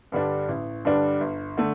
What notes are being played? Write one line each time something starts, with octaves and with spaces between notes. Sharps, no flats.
G2 D3 G3 D4
A1
G2 D3 G3 D4
G1
D3 A3